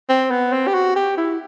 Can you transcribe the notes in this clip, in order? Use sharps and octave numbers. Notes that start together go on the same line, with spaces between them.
C4
B3
C4
G4
F#4
G4
E4